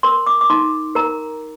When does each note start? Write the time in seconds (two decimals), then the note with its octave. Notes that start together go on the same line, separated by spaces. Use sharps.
0.03 A#4 C6
0.27 D6
0.41 D6
0.50 D#4 C6
0.95 A#4 A#5